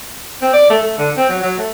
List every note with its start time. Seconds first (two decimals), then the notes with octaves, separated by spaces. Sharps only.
0.41 C4
0.53 D5
0.70 A3
0.82 A3
0.98 D3
1.17 C4
1.29 F#3
1.42 F#3
1.58 A3